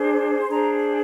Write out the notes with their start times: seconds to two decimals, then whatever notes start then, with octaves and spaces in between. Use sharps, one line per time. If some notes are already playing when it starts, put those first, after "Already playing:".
Already playing: D4 G#4 C5
0.41 C6
0.49 D4 G#4 C5 A#5